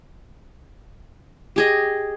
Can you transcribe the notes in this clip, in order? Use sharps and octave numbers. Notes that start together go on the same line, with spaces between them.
G4 G#4 D#5